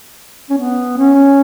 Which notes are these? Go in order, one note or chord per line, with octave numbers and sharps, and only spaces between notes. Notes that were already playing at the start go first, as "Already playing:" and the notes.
C#4
B3
C#4